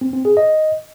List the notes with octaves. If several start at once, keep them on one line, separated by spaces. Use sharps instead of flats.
C4
C4
G#4
D#5